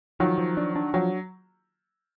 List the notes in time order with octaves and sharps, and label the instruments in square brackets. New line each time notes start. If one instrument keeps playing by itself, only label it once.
[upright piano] D#3 F#3 [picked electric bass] F3
[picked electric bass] F3
D4
D4
[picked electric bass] F3 [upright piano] F#3